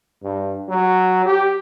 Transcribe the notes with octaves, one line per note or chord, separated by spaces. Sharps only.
G2
F#3
G4